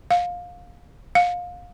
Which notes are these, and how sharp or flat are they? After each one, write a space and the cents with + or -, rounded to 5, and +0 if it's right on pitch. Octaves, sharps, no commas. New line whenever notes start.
F5 +20
F5 +25